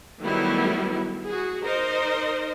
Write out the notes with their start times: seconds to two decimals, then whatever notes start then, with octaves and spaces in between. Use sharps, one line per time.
0.21 D#3 F#3 G3 A3 B3 E4
1.26 F#4 G#4
1.64 D#4 A#4 C5 D#5